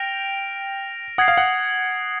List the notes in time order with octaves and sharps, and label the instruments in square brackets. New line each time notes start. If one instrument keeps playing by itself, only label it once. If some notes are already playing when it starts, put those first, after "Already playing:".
Already playing: [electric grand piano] G5 [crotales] F6 A#6 D7 F7
[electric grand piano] F#5 [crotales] D#6 G#6 C7
[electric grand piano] F5
F#5